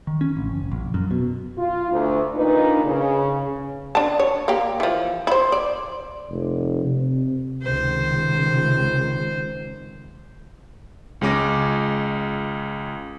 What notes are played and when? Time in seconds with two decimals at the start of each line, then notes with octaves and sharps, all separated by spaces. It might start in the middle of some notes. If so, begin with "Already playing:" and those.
0.07 D#3
0.21 C#4
0.37 A1
0.49 F#1
0.72 A#1
0.94 F#2
1.11 B2
1.57 F4
1.91 D2
2.35 A#2 D4 D#4 B4
2.84 C#3
3.95 D4 A5
4.20 C#5
4.48 A#3 G4
4.80 E3 F3
5.27 E4 C5
5.52 D5
6.30 F1
6.85 C3
7.63 C#2 C3 D#3 C5
11.21 C#2 G#3 C#4 D6 A#6